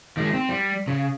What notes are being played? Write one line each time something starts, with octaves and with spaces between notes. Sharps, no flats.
D#3 G#3
C4
G3
C#3